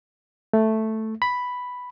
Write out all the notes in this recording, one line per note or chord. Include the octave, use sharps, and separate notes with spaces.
A3
B5